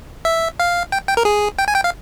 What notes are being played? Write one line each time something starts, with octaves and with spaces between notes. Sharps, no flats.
E5
F5
G5
G5
A#4
G#4
G5
G#5
G5
F5